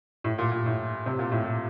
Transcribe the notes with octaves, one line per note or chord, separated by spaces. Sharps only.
A2
A#2
A#2
A2
C3
A#2
A2
A#2